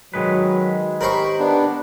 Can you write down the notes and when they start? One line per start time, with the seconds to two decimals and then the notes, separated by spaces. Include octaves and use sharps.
0.14 D#3 F#3 G#3 B4
1.01 G4 A#4 C5 B5 C#6
1.39 B3 D4